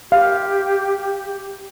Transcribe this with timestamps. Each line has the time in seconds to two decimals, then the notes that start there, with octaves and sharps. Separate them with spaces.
0.12 G4 F5